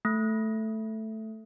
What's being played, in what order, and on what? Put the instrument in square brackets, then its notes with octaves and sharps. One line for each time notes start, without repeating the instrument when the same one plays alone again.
[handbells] A3